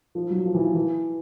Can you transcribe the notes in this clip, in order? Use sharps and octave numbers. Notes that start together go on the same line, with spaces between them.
F3
F#3
F3
E3
F3
E3